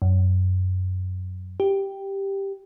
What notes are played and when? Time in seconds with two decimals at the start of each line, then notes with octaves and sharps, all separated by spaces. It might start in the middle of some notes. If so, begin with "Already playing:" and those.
0.02 F#2
1.60 G4